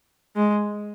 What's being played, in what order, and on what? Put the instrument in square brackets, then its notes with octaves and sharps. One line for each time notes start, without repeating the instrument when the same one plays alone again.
[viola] G#3